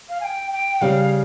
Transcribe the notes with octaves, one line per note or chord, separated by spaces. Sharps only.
F5
G#5
G5
G5
C#3 G3 C#4 F5